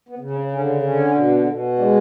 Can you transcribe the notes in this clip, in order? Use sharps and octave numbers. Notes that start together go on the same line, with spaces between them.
B3
C#3
C#4
D3 C#4
D3 C#4
B2
B2
G#3 D4